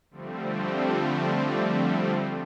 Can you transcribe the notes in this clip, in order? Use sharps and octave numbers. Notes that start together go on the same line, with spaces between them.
D3 F3 G3 A3 C4